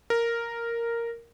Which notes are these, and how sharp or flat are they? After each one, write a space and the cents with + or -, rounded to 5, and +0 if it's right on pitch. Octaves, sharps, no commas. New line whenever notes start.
A#4 -5